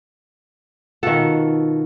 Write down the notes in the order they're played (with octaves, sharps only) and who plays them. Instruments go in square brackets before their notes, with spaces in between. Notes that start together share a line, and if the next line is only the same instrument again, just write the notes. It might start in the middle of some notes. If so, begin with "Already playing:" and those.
[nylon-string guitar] B2 F4 F#5 [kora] D#3 A4